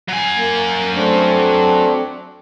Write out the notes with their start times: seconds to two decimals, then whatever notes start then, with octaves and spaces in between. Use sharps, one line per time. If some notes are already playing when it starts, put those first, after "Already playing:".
0.09 F#3 G#5
0.37 A#3
0.94 A3 C4 D4